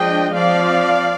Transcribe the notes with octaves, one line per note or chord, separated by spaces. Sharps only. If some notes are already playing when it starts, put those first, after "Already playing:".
Already playing: F3 G#3 D4 D#5 G5
F3 C4 D5 F5